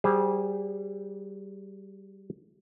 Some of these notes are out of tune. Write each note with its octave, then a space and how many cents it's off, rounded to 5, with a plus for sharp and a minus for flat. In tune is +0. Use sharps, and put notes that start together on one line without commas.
G3 -20 G#4 -35 C5 +0